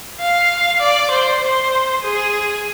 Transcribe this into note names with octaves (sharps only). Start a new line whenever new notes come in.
F5
D5
C5
C5
G#4